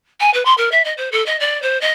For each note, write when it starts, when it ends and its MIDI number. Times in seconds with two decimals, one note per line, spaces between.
0.20 0.30 80
0.33 0.43 71
0.45 0.54 84
0.57 0.69 70
0.71 0.82 76
0.84 0.93 75
0.97 1.09 72
1.12 1.24 69
1.26 1.39 75
1.40 1.61 74
1.62 1.79 72
1.81 1.92 75